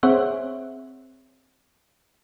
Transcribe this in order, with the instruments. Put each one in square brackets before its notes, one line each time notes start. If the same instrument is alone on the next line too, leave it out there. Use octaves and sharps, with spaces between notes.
[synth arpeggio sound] C4 G#4 C5 C#5 E5 F#5